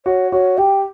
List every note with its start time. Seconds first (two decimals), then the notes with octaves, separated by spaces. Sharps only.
0.06 F#4 C#5
0.32 F#4 C#5
0.58 G4 G5